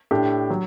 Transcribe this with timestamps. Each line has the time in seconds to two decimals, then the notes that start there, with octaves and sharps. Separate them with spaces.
0.11 A2 A3 D4 G4
0.50 F#3